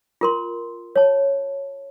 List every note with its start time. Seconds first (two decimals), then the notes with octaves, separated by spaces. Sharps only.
0.21 F4 A#4 C6
0.96 C#5 A5